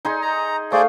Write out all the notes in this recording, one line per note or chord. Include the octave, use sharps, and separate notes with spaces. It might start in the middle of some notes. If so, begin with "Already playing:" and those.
D#4 G#4 C6
A#5
A3 G#4 C5 D5 F5